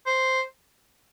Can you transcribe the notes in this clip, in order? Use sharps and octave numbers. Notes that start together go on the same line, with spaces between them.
C5